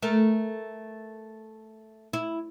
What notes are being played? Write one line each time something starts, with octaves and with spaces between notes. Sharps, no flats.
A3 A#4
E4